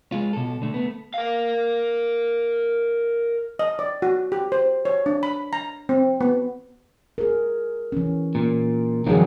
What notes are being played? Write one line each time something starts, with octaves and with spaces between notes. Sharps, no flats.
G#3 F4
B2 A4
D3 A3
A3 B3
A#4 F5
D#5
D5
F#4
G4
C5
C#5
D4
B5
A#5
C4
B3
G#4 A#4
E3 C#4
A#2
G2 D#3 F3 F#3 D4 G#4